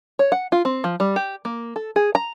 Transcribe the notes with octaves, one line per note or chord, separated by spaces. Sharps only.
C#5
F#5
F4
C4
F3
G3
G4
A#3
A4
G#4
A#5